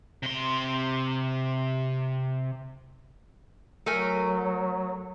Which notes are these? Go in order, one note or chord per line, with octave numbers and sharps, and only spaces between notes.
C3 C6
F#3 A3 A#4 G#5